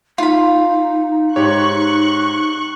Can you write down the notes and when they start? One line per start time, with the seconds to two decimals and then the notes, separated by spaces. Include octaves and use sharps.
0.18 D#4 F4 B5
1.36 G#2 G4 C#5 C#6 F#6